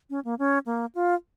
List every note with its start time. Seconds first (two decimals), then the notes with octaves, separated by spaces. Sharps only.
0.10 C#4
0.25 A#3
0.39 C#4
0.66 A#3
0.95 F4